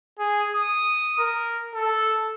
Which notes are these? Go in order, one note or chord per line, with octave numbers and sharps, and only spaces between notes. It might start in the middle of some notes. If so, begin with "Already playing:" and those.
G#4
D#6
A#4
A4